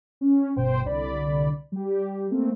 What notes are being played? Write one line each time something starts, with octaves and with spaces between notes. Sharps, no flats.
C#4
G1 B2 C5 G5
C2 D3 D5 B5
G3 G4
A3 A#3 C4